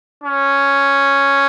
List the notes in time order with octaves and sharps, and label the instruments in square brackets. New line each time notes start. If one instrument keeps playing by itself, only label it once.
[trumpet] C#4